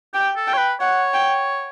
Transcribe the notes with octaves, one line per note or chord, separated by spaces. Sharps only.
G4 G5
A4
G5
C#5
B4
C#5 F#5
G5